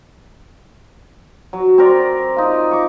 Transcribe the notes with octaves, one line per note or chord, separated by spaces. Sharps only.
F#3
C4 A#4 D5
D#4 F4
C#6 D6